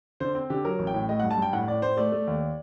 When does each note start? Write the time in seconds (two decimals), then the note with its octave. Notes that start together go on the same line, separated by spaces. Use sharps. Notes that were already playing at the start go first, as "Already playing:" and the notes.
0.20 D3 C5
0.35 C4
0.50 D3 G4
0.65 F#3 A#4
0.79 A1
0.87 G5
0.94 A2
1.09 A3 D#5
1.20 G2 F#5
1.31 A5
1.38 G2 G5
1.53 A2 F#5
1.67 A2 D5
1.82 A2 C5
1.97 A3 D5
2.12 A3
2.27 D#2